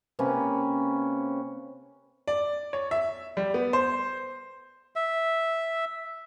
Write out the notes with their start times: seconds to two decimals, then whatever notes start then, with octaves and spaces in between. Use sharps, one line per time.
0.19 C3 A#3 C#4 B4
2.28 D5
2.73 C#5
2.91 E5
3.37 G3
3.54 B3
3.73 C5
4.96 E5